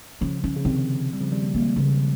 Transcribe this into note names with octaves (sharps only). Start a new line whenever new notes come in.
C#3 F3 C#4
C#4
C#3
C3 D#3 C4
G3
C#3 F3
D#3 G3
G3 A#3
G#3 A#3 C4
C#3